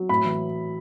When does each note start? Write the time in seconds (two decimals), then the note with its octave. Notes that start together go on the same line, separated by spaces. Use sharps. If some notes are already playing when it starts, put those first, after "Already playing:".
Already playing: F#3
0.09 A2 B5
0.25 E3